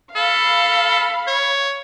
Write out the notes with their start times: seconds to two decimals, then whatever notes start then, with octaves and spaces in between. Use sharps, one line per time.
0.15 A4 F5 B5
1.27 C#5